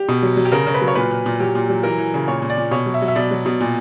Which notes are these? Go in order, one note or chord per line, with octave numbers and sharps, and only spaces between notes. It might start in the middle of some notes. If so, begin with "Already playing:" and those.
Already playing: G4
B2
F#3
F#3
G4
C#3 A#4
C#3
B4
F#3
C#5
A#2 B4
A#2
A#2
F#3 G4
A#2
F#3
E3 A#4
E3
C#3
A#2 C#5
A#2
D5
A#2
B2 C#5
F#3
E5
F#3
E5
B2 D5
F#3
B2
A#2